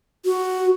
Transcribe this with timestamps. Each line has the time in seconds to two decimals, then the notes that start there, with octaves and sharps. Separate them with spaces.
0.25 F#4